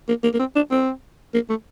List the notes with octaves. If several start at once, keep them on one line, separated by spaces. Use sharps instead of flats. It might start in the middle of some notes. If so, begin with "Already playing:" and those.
A#3
A#3
A#3
C4
D4
C4
A#3
A3